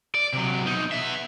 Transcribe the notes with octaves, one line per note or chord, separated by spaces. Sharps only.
D5
C3 F#3
B2 D#4
B3 E5